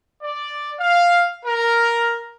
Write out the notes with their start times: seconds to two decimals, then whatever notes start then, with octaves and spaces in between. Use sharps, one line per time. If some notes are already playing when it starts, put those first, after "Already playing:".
0.22 D5
0.80 F5
1.44 A#4